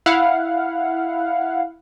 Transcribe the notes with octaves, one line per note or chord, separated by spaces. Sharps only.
E4 F5 F#5